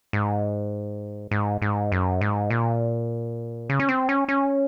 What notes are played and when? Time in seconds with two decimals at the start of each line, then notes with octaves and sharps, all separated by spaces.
0.13 G#2
1.31 G#2
1.62 G#2
1.92 F#2
2.21 G#2
2.50 A#2
3.70 C#3
3.80 C#4
3.89 C4
4.09 C#4
4.28 C#4